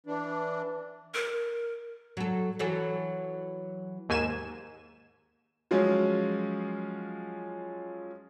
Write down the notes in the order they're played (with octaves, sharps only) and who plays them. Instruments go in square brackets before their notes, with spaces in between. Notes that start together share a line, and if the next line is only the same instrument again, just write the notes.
[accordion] E3 D4
[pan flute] A#4
[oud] F#3 A4
E3 F#3 A4
[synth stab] D#2 G#2 G#5 E7
[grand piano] F3 F#3 G#3 C#4 F4